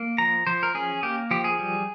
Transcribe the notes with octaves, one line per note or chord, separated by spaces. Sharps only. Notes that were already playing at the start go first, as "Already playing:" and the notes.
Already playing: A#3
F3 A#5
F3 C5
A#4
C#4 G#4
A#3 G4
F3 G4
G#4
G3